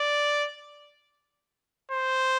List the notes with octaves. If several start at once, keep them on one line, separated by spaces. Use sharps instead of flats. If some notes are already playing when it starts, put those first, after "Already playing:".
Already playing: D5
C5